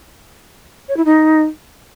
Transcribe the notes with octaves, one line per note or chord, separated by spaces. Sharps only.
C#5
E4
D#4